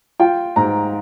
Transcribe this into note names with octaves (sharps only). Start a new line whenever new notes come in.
F4 G5
G#2 A#5